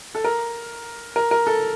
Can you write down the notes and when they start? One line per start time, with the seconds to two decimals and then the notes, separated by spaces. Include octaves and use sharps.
0.15 A4
0.24 A#4
1.16 A#4
1.31 A#4
1.47 A4